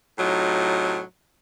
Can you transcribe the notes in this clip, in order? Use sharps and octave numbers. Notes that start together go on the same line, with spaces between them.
A2 C3 F#3 D#4 F4